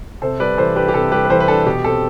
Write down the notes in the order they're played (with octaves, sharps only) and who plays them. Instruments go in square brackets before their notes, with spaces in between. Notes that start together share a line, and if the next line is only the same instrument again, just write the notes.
[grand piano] C3 A4 C5
G3 B4 D5
E3 A4 C5
D4 G4 B4
G4
C3 A4
G3 G4 B4
B4
E3 A4 C5
B4
D4 A4
B2 G4
C4 A4